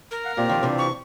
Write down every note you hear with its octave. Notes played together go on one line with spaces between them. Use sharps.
A#4
F5 F#5
A#2 C4 F4 G4
D#3 F3
C3 E3 D4
C#6